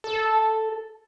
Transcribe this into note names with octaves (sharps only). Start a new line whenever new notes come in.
A4